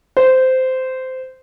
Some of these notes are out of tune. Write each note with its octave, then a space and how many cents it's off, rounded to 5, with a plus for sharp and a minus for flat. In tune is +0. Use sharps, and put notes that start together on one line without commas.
C5 -15